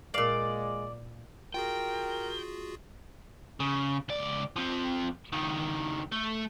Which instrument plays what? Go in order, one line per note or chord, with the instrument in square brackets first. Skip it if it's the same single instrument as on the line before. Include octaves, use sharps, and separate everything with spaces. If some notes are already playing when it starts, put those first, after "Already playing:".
[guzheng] A#2 F5 [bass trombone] G#3 [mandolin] D5
[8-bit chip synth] F4 F#4 G#4 [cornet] A#4 [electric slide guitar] G5
[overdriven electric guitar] C#3
C#2 D5
F3 C4
C#2 D#3
A3